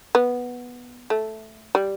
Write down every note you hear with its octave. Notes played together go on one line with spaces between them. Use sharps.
B3
A3
G3